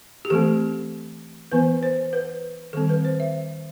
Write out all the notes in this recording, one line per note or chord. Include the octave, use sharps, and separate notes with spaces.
G4
E3 A3 C4 A4
E3 B3 B4
C5
B4
D#3 G3 C4 A4
B4
C5
E5